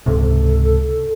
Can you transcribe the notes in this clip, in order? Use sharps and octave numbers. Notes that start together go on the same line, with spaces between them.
C#2 G#2 C3 A4